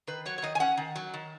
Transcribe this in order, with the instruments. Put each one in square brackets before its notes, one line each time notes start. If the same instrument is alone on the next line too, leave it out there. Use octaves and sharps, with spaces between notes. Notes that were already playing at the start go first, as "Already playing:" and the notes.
[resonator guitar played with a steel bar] D#3 B4
F#3 C#5
C#5
D#3 D#5
G#5
C#4 F#5
D#3
F#3
D#3